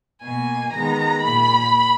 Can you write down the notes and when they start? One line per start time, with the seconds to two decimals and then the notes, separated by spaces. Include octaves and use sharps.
0.23 B2 A#3 G#5
0.73 D#3 G#3 B3 A#5
1.23 A#2 A#3 B5